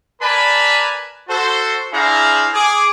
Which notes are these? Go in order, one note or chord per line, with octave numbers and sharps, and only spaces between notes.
A#4 B4 D5 G#5 A5 B5
F#4 A4 C5
D4 E4 G#4 C5 F5 A#5
G#4 D6